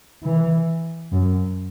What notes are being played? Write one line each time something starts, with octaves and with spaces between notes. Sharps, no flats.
E3
F#2